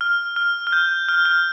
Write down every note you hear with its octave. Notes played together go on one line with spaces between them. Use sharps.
F6
F6
F6
G6
F6
F6